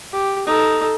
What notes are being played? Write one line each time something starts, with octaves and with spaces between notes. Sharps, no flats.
G4
D#4 A4